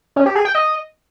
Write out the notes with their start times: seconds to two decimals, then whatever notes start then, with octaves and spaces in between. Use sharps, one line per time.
0.16 C#4
0.26 G4
0.35 G#4
0.45 G5
0.55 D#5